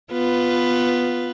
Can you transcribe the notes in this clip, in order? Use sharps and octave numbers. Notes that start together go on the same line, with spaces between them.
B3 F4 B4